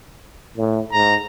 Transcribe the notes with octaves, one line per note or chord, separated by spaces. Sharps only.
A2
G#2 A#5